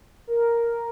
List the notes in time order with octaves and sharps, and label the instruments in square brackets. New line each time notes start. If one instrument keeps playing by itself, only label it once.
[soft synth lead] A#4